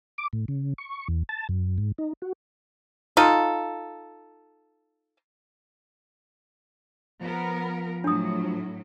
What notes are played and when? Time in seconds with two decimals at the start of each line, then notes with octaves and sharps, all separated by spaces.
0.18 D6
0.33 A2
0.48 C#3
0.78 C#6
1.08 E2
1.29 A5
1.49 F#2
1.78 G#2
1.98 D#4
2.22 F#4
3.17 D#4 F4 A4
7.21 F3 B3 A#4
8.04 A2 F#3 D4 D#6